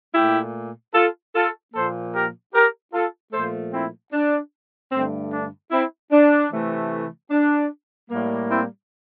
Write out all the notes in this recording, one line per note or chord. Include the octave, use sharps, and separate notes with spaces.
A#2 A3 E4 G4
F4 A4
F4 A4
A#2 F3 A#3 A4 C5
G4 A#4
G4 A#4
F4 A4
A#2 F3 A3 A4 C5
C4 E4
D4
G2 D3 A3 C4
D4
C4 E4
D4
C3 E3 A3
D4
A2 G3 A#3
C4 E4